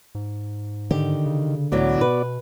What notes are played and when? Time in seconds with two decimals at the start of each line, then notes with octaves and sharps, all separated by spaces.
0.15 G#2
0.91 D3 D#3 G4
1.26 C#3
1.72 C#2 A2 E3 F#3 B3 F#4 D5
2.01 B2 B4